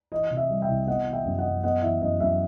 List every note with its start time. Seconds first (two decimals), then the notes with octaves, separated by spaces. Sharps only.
0.12 E3 D#5
0.30 C3
0.37 E5
0.50 G3
0.62 E5 G5
0.68 C2
0.88 B3 D#5 F#5
1.06 E3
1.13 E5 G5
1.25 F#2
1.38 D#5 F#5
1.45 F#2
1.63 B3 D#5 F#5
1.83 E3 E5
2.02 F#2 D#5
2.20 F#2 E5